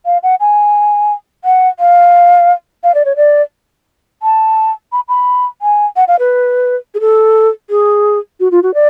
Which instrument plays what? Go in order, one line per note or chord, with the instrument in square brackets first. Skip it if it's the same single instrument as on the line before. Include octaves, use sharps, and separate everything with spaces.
[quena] F5
F#5
G#5
F#5
F5
F5
D5
C#5
D5
A5
B5
B5
G#5
F#5
F5
B4
G#4
A4
G#4
F#4
F4
F#4
D5